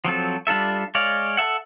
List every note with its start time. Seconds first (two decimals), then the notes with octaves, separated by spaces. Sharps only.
0.05 F3 F#3 C4 A4
0.47 G3 D4 F4 A4 E5
0.95 G#3 C#5 D5 F5
1.37 A4 E5 F#5